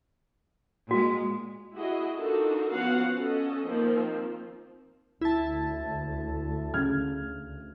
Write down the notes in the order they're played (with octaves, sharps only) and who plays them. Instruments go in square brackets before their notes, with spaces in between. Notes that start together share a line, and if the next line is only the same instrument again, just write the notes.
[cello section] A#2 G#3 [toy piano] F#4
[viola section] E4 F#4 G#4 D#5
D4 D#4 F4 F#4 A4 A#4
F3 B3 C#4 F#4 F5 F#5
C#4 A4 D#5
D#3 F3 A#3 C4
[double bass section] D2 [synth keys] E4 A5
[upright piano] C#3 F6 G#6